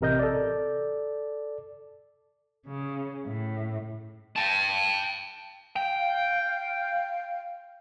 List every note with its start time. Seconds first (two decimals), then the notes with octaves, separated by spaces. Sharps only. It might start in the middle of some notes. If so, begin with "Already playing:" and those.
0.01 A1 C3 A#4 D#5 G6
0.19 A4 D5
2.67 C#3
3.26 A2
4.36 G5 A5
5.76 F5 G5